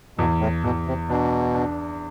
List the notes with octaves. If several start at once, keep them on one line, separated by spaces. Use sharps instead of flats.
E2 B2
A2
E2 B2
C3
B2 D4
D4